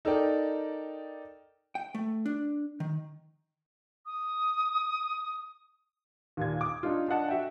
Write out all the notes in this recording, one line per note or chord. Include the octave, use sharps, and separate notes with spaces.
D#4 A4 A#4 D5 G5
G5
A3
D4
D#3
D#6
D#2 A#2 G#6
D6 D#6
D4 D#4 F4
D4 D#5 F#5 A5
F#4 E5 F#5 G5